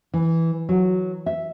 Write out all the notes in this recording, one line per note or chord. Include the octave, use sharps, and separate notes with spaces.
E3
F#3
E5